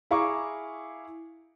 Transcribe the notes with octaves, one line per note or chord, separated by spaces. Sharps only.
E4 G#4 F5 A#5 C#6 D6